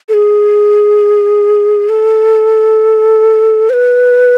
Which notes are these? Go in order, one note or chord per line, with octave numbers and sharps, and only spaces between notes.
A4
G#4
A4
C5
B4